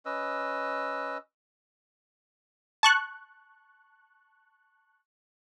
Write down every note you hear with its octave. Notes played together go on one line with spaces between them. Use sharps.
C#4 B4 D#5 E6
A5 C#6 F#6